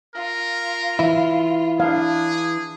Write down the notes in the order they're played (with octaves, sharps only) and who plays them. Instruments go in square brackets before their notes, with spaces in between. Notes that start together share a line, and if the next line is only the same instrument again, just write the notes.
[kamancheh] F4 [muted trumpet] A#4
[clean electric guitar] E3 E4
[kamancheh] D4 [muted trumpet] G#4 [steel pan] F5